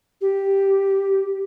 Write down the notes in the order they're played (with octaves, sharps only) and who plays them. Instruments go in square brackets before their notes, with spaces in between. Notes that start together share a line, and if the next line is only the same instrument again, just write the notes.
[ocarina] G4